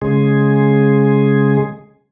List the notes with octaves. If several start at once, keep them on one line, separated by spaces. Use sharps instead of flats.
C#3 G#3 G#4